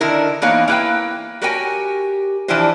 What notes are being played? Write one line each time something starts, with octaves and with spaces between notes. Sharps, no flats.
D3 D#3 E4 A#4
E3 A#3 B3 D#4 C#5 F5
A#3 E4 B4 F5 G5
F#4 G4 A#4 C#5 G5 G#5
E3 F3 D4 E4 G4 C5